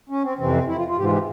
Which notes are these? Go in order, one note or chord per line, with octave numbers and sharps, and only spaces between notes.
C#4
C4
F2 C3 E3 C4
E4
F4
F4
G#2 E3 F4 G4
G4